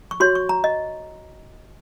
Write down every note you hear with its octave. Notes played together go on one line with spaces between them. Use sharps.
C#6
F#4 C#5 C6
C#6
A#5
D#5